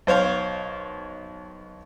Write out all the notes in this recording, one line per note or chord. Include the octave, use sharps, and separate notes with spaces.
B1 C5 C#5 F5